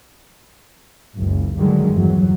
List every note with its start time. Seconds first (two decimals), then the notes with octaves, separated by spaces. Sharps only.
1.17 F#1 C#2
1.57 G2 D3 D#3 F#3 G#3
1.92 G1 E2 F#3